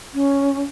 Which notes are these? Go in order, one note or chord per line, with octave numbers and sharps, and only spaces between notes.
C#4